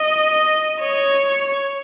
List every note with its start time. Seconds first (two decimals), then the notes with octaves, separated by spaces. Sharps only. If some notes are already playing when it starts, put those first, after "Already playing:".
Already playing: D#5
0.82 C#5